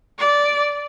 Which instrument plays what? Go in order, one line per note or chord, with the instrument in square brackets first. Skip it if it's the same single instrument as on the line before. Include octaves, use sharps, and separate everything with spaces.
[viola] D5